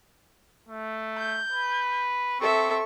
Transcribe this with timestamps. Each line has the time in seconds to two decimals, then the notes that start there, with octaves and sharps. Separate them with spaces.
0.69 A3
1.18 G6
1.52 B4
2.40 C4 A4 E5 C#6